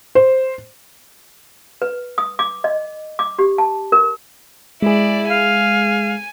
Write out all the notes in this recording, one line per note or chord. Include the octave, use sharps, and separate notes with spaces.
C5
B4
D#6
D6
D#5
D6
G4
A5
A#4
G#3 E4 G#4 D5
F5 G#5